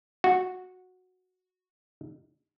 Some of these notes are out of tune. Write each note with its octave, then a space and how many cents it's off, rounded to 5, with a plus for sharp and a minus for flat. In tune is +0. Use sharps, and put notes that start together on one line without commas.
F#4 -10